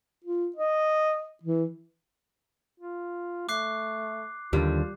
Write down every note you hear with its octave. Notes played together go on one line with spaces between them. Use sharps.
F4
D#5
E3
F4
A3 D6 F#6 C7
D#2 D3 G3 F4